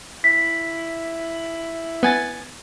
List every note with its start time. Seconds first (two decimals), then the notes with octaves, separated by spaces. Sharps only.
0.24 E4 B6
2.03 B3 G#5 A6